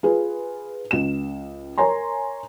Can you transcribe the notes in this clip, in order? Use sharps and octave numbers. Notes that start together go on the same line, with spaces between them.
F4 G#4 B4
C#2 E7
A#4 C#5 G#5 A#5 C6